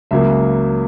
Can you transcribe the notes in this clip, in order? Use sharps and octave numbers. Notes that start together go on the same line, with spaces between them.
C#2 C#3 F#3 A#3 E5